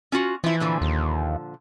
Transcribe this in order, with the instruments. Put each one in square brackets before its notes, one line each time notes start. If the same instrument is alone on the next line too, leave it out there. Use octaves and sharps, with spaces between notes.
[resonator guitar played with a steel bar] C#4 F4 F#4
[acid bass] E3 [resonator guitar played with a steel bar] F3 E4
[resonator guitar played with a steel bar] A#2 D3 F3
[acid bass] D#2